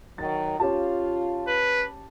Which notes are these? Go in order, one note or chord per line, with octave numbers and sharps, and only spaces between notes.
D#3 F#3 A6
C#4 F4 G4 A5
B4